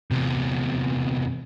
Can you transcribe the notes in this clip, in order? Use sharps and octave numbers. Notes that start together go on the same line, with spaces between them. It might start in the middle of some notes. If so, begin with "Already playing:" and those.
E2 C3